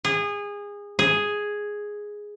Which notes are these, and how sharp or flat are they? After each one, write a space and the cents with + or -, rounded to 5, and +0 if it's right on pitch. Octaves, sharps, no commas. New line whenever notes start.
G#4 -25
G#4 +0